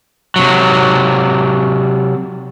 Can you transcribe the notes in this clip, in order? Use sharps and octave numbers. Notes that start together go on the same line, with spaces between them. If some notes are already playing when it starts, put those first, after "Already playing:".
C3 F#3